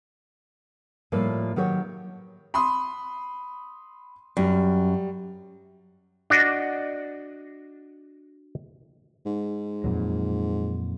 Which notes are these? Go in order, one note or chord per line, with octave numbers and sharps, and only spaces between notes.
A2 F3 G3 A#3
D#3 F#3 G4 C#5
B5 C6 D#6
F#2 G3
D4 F#4 D5 D#5
G#2
F2 A#2 F#3